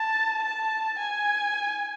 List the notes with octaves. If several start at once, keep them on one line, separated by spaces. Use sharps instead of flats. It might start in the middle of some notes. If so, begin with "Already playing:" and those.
Already playing: A5
A5
G#5